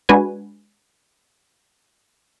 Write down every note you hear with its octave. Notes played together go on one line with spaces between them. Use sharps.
G#3 D4 F#4 B4 G#5